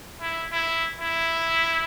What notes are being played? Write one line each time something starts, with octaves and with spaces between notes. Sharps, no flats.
E4
E4
E4